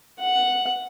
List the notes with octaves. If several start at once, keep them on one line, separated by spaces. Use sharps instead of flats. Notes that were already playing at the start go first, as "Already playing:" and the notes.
F#5